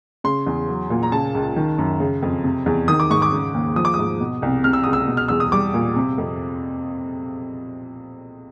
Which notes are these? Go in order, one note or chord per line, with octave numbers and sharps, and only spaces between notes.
C#3 C6
E2
F#3
A#2
A#5
C#3 A5
C#2
D#3
F#2
C#3
F2
C3
E2
D#3 D#6
D6
G#2 C#6
D6
C#3
D#2
F3 D#6
D6
G#2 D#6
B2
C2
C3 F6
E6
C#2 D#6
E6
B2
F6
E2 E6
D#6
G3 D6
A#2
C3
F2